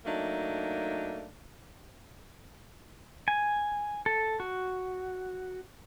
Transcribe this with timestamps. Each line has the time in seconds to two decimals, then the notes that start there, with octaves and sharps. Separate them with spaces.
0.05 F#3 A3 A#3 D4 D#4
3.28 G#5
4.06 A4
4.40 F#4